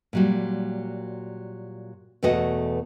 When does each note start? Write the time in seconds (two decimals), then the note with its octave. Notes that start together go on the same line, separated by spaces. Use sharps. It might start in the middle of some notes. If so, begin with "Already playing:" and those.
0.13 A#2 F#3 G3
2.23 E2 B2 A3 F#4 D#5 F#5